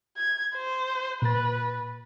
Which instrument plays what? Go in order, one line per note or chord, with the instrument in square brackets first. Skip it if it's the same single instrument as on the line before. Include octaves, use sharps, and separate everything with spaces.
[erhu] G#6
C5
[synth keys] A#2 A6 [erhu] B4